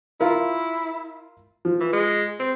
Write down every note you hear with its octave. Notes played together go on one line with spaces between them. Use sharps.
E4 F4 A#4
F3
E3
G#3
C4